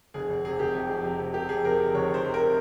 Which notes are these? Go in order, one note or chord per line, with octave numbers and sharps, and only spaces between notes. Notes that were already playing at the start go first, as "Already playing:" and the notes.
F1 G#4
F1
C3 G#4
F1 G4
F2 G#4
F2
C3
C3
C3 G4
F2 G#4
C3 A#4
F2
F1 C#5
F1 C5
C3
A#4